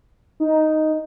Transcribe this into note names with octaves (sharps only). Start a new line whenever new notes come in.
D#4